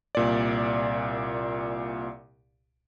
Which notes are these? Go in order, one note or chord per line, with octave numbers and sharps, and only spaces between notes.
C2 A#2 D5